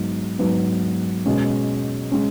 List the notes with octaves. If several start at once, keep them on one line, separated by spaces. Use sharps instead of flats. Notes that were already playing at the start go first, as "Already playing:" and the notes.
Already playing: G#2 F#3 B3
G#2 F#3 B3
B2 G#3 C#4
G#3 C#4